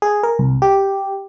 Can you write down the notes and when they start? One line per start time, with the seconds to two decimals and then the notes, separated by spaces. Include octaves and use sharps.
0.02 G#4
0.23 A#4
0.39 C2
0.62 G4